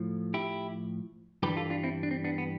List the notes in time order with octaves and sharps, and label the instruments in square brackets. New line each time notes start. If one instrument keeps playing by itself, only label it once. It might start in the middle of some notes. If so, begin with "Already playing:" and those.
Already playing: [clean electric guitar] A2 F3
E4 G4
G2 E3 G3 G4 B4
F4 A4
D4 F4
C4 E4
D4
C4
B3 D4
B3